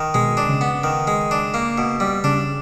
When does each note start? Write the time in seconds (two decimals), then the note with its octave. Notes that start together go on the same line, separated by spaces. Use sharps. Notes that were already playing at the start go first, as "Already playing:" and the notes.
Already playing: D#3
0.14 B2 G#3
0.37 D4
0.49 C#3
0.61 B3
0.84 D#3
1.07 G#3
1.31 D4
1.54 A#3
1.78 B2
2.00 G3
2.24 C#3 D4